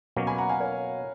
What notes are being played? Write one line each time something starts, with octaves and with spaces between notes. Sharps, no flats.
B2 F#3 A#3 C#4
G#5 B5
F#5 A#5
F5 G#5
A#4 C#5